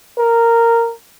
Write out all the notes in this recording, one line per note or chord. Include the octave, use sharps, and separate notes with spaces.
A#4